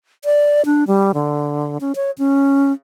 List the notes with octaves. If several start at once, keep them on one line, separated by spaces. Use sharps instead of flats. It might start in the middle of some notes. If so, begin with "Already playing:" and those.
D5
D4
G3
D3
C#4
C#5
C#4